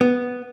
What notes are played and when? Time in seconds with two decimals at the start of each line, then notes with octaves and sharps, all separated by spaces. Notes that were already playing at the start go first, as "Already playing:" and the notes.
0.01 B3